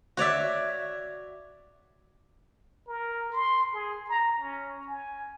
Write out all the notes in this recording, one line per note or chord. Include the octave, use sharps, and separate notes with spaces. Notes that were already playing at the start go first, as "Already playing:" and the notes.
F#4 C#5 D5 E5
A#4
C6
G#4
A#5
C#4
G#5